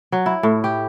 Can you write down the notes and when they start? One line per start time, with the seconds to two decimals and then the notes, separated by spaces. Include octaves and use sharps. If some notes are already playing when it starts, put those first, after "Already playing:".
0.12 F#3
0.26 E4
0.43 A2
0.64 G4